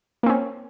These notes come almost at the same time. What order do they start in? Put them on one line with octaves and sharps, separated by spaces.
A#3 C4 C#4